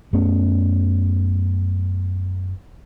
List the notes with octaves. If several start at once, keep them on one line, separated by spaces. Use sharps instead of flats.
F#2 A3 B3 C#4